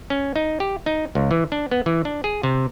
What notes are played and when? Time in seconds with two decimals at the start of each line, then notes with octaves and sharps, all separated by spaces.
0.10 C#4
0.36 D#4
0.60 G4
0.86 D#4
1.15 C#2
1.31 E3
1.52 D4
1.71 B3
1.86 E3
2.05 D4
2.24 G#4
2.43 C3